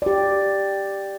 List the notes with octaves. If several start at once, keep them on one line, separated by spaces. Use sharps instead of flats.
G4 D5